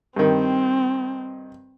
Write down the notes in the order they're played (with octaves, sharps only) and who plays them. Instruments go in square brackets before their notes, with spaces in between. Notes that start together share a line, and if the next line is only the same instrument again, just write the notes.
[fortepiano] G2 D#3 [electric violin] C4